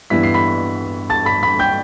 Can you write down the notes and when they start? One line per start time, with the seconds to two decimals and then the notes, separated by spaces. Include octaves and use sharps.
0.10 G2 E3 B3 E4 B6
0.23 C7
0.34 B5 B6
1.10 A5 A6
1.26 B5 B6
1.43 B5 B6
1.59 G5 G6